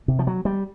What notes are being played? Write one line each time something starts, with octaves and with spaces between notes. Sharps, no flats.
C3
F3
F#3
G3